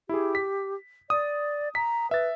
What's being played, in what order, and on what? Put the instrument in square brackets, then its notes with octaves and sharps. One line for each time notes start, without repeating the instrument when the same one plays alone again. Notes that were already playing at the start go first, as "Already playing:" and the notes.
[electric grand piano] E4 G#4 [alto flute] G4
[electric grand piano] B6
[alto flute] D5 [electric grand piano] D#6
[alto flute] A#5 [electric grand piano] B6
[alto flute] B4 [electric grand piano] E5 A6